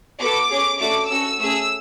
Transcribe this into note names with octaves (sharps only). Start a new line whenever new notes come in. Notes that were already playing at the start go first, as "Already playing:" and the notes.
B3 F#4 A4 D6
C#4 G#4
A3 D4 F#4 D6
C#4 F#4 A4 E6
A3 C#4 G#4 E6